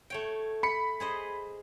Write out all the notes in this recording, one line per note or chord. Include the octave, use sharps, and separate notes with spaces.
A3 C#5 G5
B5 C#7
G#4 C5 D#5